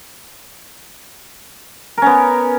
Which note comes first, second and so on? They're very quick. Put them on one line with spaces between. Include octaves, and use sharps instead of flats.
A#4 C#4 B3